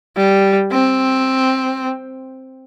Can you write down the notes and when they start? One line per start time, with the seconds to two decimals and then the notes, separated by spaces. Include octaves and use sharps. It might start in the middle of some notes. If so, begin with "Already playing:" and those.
0.17 G3
0.72 C4